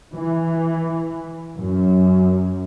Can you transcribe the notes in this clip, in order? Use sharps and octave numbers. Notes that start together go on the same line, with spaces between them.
E3
F#2